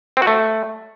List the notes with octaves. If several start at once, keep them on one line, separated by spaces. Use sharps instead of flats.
C4
F#4
A3